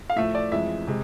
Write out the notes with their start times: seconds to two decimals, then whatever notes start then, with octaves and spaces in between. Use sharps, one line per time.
0.10 F5
0.16 A2 F3 A3 E5
0.35 D5
0.52 F2 E3 G#3 E5
0.88 C3 G#3